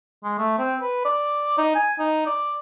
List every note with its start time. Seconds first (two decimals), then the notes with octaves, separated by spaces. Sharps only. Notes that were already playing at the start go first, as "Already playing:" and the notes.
0.24 G#3
0.38 A3
0.58 C4
0.81 B4
1.05 D5
1.58 D#4
1.75 G#5
1.99 D#4
2.26 D5